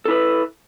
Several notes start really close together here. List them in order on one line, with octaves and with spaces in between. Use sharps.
A4 E4 B4